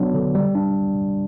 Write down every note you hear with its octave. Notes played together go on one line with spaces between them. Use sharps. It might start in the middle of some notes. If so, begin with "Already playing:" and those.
Already playing: F#3 B3 D4
D3
G3
D4